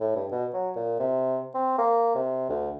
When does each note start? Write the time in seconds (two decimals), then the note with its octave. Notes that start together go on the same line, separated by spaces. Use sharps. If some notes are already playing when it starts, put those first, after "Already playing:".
0.01 A2
0.16 G2
0.32 B2
0.53 F#3
0.76 A#2
0.99 C3
1.54 C4
1.78 A#3
2.15 C3
2.49 D2